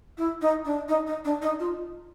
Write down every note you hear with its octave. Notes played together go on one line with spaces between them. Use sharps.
E4
D#4
D4
D#4
D#4
D4
D#4
F4